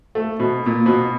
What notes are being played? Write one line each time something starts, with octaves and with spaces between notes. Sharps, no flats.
A3
B2
A#2
B2